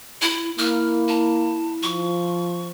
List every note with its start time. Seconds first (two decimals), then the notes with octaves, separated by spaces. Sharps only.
0.22 E4
0.58 A#3 E4 F6
1.08 A5
1.83 F3 C#6